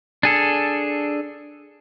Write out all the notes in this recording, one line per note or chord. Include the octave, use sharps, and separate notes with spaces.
D4 G#4 A4